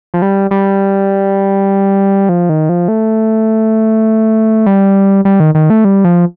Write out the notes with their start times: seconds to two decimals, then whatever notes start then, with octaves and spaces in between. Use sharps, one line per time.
0.14 F3
0.22 G3
0.51 G3
2.29 F3
2.49 D#3
2.69 F3
2.88 A3
4.66 G3
5.25 G3
5.40 D#3
5.55 D#3
5.70 A3
5.85 G3
6.04 F3